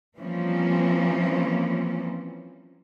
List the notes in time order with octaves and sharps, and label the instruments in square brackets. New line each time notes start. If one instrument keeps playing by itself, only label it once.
[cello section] E3 F3 G3 A#3 C4 C#4